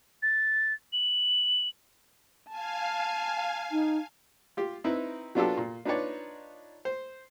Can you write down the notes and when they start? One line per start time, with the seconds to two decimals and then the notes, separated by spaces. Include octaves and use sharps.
0.22 A6
0.93 F#7
2.49 F5 G#5 A5
3.72 D#4
4.57 F4 G4
4.84 C4 D#4 E4 B4
5.35 F#3 B3 D4 F4 G4 A4
5.57 A#2
5.86 D4 D#4 F4 B4 C#5 D5
6.85 C5